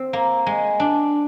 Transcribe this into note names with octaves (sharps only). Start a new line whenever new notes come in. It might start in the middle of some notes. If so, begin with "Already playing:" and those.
Already playing: C4
A#3
G#3
D4